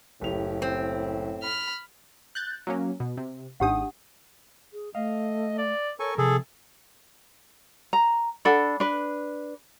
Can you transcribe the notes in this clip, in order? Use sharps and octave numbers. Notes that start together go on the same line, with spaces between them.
F#1 A2 G4 F7
C4
B5 F6
F#6 G6 A6
F#3 A#3 C#4
B2
C3
G#1 G#2 D4 G4 F#5 D#6
G#4
A3 D#5 F5
D5
A4 A#4 C#5 G#5 C#6
C3 F3 G#4 A4
A#5
D4 A4 F#5 B5
D4 B4